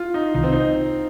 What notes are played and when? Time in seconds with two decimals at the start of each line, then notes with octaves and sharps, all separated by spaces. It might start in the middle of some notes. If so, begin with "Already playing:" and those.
Already playing: F4
0.14 D#4
0.34 C2 C3 D#3 D#4
0.44 C4
0.52 D#4